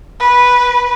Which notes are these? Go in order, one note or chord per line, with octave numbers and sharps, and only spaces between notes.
B4